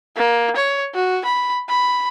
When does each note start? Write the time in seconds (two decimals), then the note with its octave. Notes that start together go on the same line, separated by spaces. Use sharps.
0.17 A#3
0.56 C#5
0.95 F#4
1.25 B5
1.69 B5